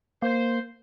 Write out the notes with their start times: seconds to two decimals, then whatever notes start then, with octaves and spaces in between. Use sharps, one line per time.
0.22 A#3 C5